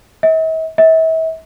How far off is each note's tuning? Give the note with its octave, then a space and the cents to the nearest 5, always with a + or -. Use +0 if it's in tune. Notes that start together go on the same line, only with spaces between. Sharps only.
E5 -45
E5 -35